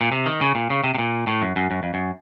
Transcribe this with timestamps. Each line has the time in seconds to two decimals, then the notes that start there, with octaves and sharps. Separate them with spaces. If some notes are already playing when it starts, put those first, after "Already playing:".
0.01 A#2
0.12 C3
0.26 D#3
0.41 C#3
0.55 A#2
0.70 C#3
0.84 C3
0.95 C3
0.98 A#2
1.27 A2
1.42 F#2
1.56 F#2
1.71 F#2
1.83 F2
1.94 F#2